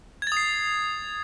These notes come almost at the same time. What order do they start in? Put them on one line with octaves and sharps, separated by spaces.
G#6 A6 D#6 C7